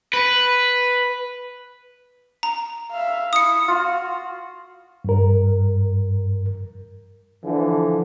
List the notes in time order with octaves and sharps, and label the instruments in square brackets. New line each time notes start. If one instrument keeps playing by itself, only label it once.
[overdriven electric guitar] B4
[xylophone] A#5
[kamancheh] E5 F5
[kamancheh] E4 [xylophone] D#6 C#7
[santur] F4 [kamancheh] F#4
[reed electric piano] G2 A#4
[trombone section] D3 E3 F3